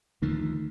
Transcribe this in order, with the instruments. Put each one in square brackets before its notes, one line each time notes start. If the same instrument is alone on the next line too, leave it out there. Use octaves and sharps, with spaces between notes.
[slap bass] D2 D3 F3 A3 [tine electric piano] D#3 D#4